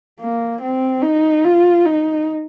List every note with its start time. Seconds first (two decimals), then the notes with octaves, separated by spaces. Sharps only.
0.20 A#3
0.62 C4
1.03 D#4
1.44 F4
1.86 D#4